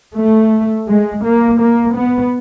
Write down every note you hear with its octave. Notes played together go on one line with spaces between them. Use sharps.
A3
G#3
A#3
A#3
B3